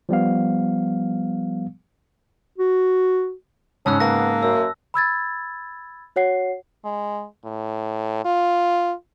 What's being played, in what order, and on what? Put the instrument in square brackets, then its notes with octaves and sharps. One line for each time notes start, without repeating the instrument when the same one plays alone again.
[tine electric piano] F3 G3 B3 F5
[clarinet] F#4
[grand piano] G#2 C#3 [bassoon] C#4 [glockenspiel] A5 E6 F#6
[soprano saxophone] A#3 [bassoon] B3 [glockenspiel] A#6
[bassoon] F#2 [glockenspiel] E6
[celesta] B5 E6 G#6 A6
F#4 C#5 F#5 C7
[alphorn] G#3
A2
F4